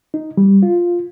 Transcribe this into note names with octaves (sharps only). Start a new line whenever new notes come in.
D#4
G3
F4